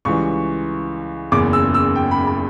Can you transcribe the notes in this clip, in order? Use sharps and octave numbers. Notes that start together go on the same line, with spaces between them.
C#2 C#3 E3 G3 C#6
F#1 E2 C#3 D6
E6
E6
G5
B5
B5